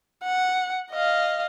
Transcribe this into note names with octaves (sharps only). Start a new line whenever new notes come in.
F#5
D#5 F5